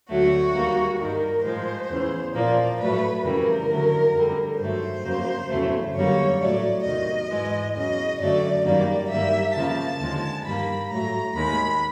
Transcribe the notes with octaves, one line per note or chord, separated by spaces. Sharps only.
D2 D3 F#3 A3 F#4
D#2 D#3 G3 A#3
G2 D#3 G3 A#4
A2 F3 G#3 C5
E2 C#3 E3
A#2 F3 A#3 D5
A2 F#3 A3 B4
F2 C#3 E3 G3 A#4
F2 D3 F#3 A3
F2 D3 G3
G2 D#3 F#3 A3 C5
F2 C#3 F#3 A#3
E2 C#3 F#3 A3
F#2 D3 G3 A#3 C#5
A2 F#3 A3 D5
E2 C3 D#3 F#3 D#5
G#2 E3 G#3
E2 C#3 F#3 D#5
F#2 D3 F#3 A3 D5
F#2 D#3 G3 A#3 D5
G2 D#3 G3 A#3 E5
F2 C#3 F3 A#3 A5
D#2 D3 F3 G#3
G2 D#3 G3 A#3 B5
A2 F#3 A3 A#5
D#2 D#3 G#3 B5